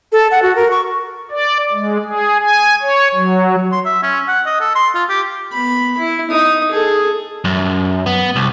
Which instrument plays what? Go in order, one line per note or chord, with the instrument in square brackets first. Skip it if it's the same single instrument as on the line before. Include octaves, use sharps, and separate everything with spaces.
[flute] A4
F#5
F#4
A#4
C#6
[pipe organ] D5
G#3
G#4
G#5
C#5
F#3
[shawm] C6
E5
C#4
F#5
D#5
A4
C6
F4
G4
[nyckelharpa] B3 B5
E4
D#4 D#6
G#4 A4
[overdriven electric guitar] F#2
B3
C2